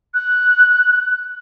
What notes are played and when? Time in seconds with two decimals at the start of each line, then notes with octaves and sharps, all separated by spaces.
0.14 F#6